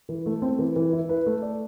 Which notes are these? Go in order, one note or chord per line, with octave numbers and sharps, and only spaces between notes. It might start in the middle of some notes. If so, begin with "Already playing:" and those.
E3
A3
C4
E3
E3
E4
B4
A3
D5